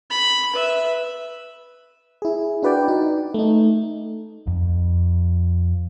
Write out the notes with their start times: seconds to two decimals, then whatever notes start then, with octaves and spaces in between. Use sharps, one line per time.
0.10 B5
0.53 B4 E5
2.22 E4 G#4
2.63 D4 F#4 B4 D5 G5
2.88 D#4
3.34 A3 D#4
4.47 F2